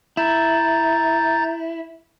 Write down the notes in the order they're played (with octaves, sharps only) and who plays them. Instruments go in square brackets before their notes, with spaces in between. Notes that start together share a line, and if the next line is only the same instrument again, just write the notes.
[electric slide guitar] E4 [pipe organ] A#5 G6 A6